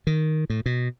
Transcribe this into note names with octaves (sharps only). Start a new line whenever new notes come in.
D#3
A2
B2